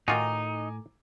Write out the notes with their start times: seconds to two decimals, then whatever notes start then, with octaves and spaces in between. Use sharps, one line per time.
0.08 A2 D#3 D#4 F4 F#4 G#5 A#5 D6